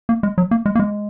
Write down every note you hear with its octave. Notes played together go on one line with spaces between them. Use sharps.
A#3
G#3
F#3
A#3
G#3
A#3
G#3